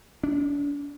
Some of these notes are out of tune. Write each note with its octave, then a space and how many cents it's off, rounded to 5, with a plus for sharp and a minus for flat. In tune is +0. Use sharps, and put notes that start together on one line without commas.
D4 -40